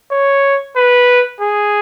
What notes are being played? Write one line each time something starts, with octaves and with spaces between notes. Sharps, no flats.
C#5
B4
G#4